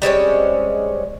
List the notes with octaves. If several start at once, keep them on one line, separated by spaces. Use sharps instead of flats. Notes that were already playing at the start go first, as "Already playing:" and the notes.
G3 G#3 C4 C#4